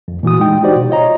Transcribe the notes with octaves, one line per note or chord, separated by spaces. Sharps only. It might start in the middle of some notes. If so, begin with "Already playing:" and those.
F2
A#2 E3 F#4 D#6
G#3 D#4 G5
D#4 F#4 G4 C5 D5
B2
F4 C#5 D#5 A#5